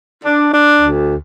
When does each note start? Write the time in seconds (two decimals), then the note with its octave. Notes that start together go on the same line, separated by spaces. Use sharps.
0.25 D4
0.53 D4
0.81 D2